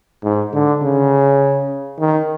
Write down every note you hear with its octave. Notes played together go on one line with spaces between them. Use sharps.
G#2
D3
C#3
D#3